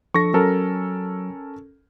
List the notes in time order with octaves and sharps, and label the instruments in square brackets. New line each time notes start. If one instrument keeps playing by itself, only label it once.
[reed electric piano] F3 D4 A4 [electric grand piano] C#6 A#6
[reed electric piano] F#3 [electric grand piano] C#4 A4 A#4